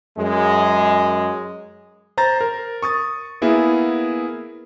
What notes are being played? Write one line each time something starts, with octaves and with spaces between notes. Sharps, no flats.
F#2 G#3
C5 A#5 A6 A#6
A#4
C#6 D#6 A6
A#3 B3 E4 G#4 A#4